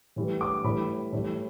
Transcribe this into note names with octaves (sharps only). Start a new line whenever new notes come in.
A2 E3 G3
D6
A2 E3 G3 B5
A2 E3 G3